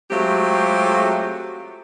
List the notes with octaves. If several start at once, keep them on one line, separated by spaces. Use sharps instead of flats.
F#3 G#3 A3 C4 F4 G4